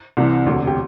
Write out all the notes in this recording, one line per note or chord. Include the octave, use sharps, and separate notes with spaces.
C2 C3 E3
E1 D2 C3
G4